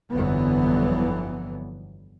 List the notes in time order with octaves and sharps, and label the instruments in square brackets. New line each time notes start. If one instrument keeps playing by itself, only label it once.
[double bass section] G1 F2 D3 E3 F#3 B3